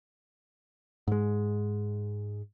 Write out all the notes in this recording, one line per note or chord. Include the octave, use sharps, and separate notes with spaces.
G#2 G#3